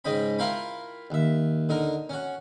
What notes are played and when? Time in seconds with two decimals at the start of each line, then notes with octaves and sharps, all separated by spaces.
0.05 G#2 C#3 D#5 G5 B5
0.39 E4 F4 A#4 F5 G5 B5
1.10 D#2 E5
1.69 D3 D#4 A#4
2.09 C#4 F#4